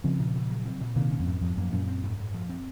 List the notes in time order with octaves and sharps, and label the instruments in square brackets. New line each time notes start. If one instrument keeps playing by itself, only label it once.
[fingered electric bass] C#3 F3 [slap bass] C4
[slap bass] A#2
A#2
F#3
C4
A#2
[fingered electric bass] C3 D#3 [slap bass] A#3
[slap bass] C#4
[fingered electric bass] F2
[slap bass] G#2
[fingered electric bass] F2 [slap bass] F3
[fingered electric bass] F#2 [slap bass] A#3
[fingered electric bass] F#2 A#2 [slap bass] C#4
[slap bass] C4
G#2
G#2
F3
C4